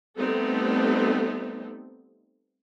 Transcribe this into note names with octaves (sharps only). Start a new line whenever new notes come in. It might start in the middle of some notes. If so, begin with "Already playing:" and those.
G3 A3 B3 C4 D#4 A4